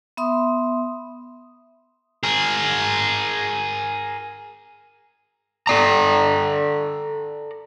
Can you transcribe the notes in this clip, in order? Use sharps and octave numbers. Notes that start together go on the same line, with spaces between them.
B3 E5 C6 D#6
G#4 A#4
A4 D5 A#5